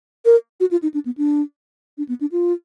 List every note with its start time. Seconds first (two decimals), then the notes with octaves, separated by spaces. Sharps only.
0.25 A#4
0.60 F#4
0.71 F4
0.83 D#4
0.94 D4
1.06 B3
1.17 D4
1.98 D4
2.09 B3
2.21 D4
2.32 F4